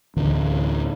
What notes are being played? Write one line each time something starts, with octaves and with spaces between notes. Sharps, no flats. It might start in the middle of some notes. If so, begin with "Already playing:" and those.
D2 A2 D3 E3